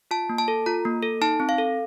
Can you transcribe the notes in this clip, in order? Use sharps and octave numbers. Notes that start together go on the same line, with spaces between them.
F4 A5
A#3
A5
A4
F4 A#5
A#3
A4
D#4 A5
C4
F5
A4